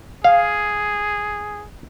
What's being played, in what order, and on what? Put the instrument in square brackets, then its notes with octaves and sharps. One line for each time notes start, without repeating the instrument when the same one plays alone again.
[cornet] G#4 [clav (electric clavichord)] F5